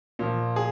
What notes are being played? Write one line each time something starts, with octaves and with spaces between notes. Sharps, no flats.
A#2 F3
G#4